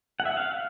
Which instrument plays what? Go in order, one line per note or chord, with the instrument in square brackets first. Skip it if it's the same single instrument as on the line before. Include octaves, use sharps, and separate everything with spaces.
[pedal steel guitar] F#5
E5
F#5
F5